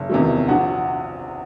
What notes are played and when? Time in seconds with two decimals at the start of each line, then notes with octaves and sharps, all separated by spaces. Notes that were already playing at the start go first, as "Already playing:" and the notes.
Already playing: F#1
0.09 E2 C3 D#3 F#3
0.48 A#1 F#4 F#5